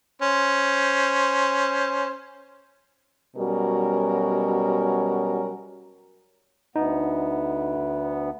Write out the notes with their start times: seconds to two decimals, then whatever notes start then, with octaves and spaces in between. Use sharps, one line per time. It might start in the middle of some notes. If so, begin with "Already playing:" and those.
0.22 C#4 C5
3.36 B2 F#3 G3 C#4 F#4 A#4
6.76 D2 B3 D#4